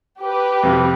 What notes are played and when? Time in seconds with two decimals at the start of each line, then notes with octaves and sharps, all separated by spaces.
0.21 G4 B4
0.63 F2 C3 F3